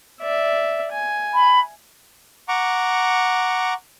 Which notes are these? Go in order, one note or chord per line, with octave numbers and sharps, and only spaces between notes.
D5 E5
G#5
B5
F#5 A#5 C#6 D6